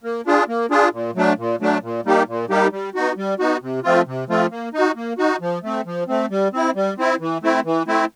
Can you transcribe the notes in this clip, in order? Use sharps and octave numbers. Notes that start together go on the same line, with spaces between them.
A#3
D4 F4 G#4
A#3
D4 F4 G#4
A#2
F#3 A3 D4
A#2
F#3 A3 D4
A#2
G3 A#3 D#4 G4
A#2
G3 A#3 D#4 G4
G3
B3 D#4 F#4
G3
B3 D#4 F#4
C3
F3 A3 C4 F4
C3
F3 A3 C4 F4
A#3
D#4 F#4
A#3
D#4 F#4
F3
A3 C4
F3
A3 C4
G3
C4 E4
G3
C4 E4
E3
A3 C4 E4
E3
A3 C4 E4